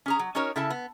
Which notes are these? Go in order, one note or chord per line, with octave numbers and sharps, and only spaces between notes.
C#4 G#4 A#5
F#3
C#4 D#4 F#4 A#4 C#5
C#3 E4 A4 E5 A5
B3